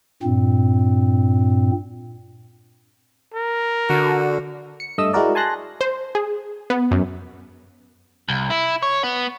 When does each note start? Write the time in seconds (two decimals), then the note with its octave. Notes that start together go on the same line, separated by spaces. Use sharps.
0.23 G2 A#2 C4
3.34 A#4
3.90 D3 F#4
4.80 C#7
4.98 G2 A3 D#5 E5 D#6 E6
5.13 G#3 E4 F#4 A#4 D5
5.35 G#5 A5 C6 F#6 A#6
5.81 C5
6.15 G#4
6.70 B3
6.91 F#2
8.29 C2
8.50 E4
8.83 C#5
9.03 B3